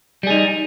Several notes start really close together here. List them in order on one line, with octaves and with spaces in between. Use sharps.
G3 G#4 D#4